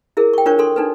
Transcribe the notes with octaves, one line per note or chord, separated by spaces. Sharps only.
E4 G#4 A#4
G5 C#6
D4 F4 A#4 C5 C#5 C#6
D4 A4 C6
D4 D#4 A4 B4